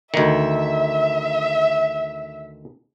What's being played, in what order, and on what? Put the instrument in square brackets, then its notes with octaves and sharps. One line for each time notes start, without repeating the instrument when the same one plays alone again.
[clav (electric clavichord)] D2 D#3 [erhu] E5